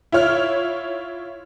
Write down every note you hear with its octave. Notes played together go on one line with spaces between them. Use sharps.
E4 F4 C#5 F6